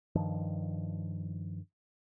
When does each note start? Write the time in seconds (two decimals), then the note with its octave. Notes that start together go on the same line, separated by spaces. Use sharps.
0.15 G2 D#3 F3